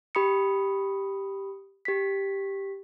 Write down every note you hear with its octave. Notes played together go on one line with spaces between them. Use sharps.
G4 B5 D#6 C#7
G4 B6